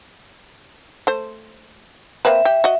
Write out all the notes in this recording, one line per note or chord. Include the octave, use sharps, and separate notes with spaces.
A3 C5
A#3 C4 B4 E5
G4
F#4 D#5